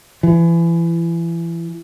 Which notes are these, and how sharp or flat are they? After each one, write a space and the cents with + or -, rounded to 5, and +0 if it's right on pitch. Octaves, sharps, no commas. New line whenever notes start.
E3 +30